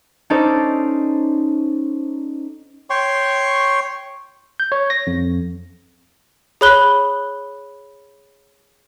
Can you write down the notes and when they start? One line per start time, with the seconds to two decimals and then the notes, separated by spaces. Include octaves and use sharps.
0.30 C#4 D#4 A4 C5 D5
2.90 C#5 G5 C6 C#6
4.60 G6
4.72 C#5
4.90 A#6
5.07 F2
6.61 G#4 C#5 B5 F#6 G7